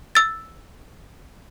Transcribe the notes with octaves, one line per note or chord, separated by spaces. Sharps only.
E6 A6